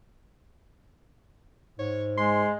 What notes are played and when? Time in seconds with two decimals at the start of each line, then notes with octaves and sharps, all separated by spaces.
1.79 G#2 C#5
2.18 G#3 C6